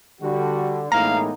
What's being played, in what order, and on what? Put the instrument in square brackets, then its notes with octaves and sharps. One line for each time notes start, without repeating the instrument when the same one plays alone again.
[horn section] D3 [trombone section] G3 F#4
[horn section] A2 G#3 A#3 [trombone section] E3 B3 D#4 [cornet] F5 [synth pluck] A#5